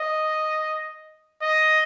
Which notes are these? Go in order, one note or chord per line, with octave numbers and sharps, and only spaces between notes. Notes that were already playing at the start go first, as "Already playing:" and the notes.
Already playing: D#5
D#5